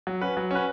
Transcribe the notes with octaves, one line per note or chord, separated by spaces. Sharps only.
F#3
C#4 F#4 B4
F#3
C#4 F#4 B4